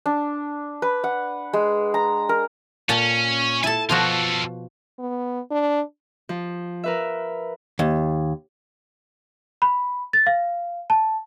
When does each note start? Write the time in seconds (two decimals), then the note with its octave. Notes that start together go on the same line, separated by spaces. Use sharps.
0.06 D4
0.82 B4
1.04 F#5
1.53 G#3
1.94 A#5
2.29 A#4
2.89 A#2 C#4 G#5 A5
3.64 E4 A4 G#5 A5
3.89 B2 F3 F4 F#4 A4
4.99 B3
5.51 D4
6.29 F3
6.84 A#4 B4 E5
7.79 D#2
9.62 B5
10.13 A6
10.27 F5
10.90 A5